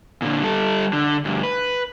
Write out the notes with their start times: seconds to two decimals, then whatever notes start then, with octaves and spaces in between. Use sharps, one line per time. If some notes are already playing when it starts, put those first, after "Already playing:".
0.22 A#2 D3
0.42 G3 A4
0.93 D3
1.25 D2 G2
1.43 B4